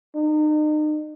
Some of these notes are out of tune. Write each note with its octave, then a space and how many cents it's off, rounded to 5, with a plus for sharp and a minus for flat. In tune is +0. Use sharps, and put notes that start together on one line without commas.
D#4 -35